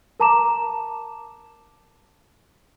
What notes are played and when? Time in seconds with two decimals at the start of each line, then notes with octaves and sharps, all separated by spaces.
0.20 A#4 A5 A#5 D6 E7